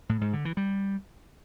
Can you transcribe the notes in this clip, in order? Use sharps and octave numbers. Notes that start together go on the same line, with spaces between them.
A2
G#2
D3
E3
G3